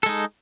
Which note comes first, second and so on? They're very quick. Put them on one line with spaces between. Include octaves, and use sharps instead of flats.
A4 G#3 D#4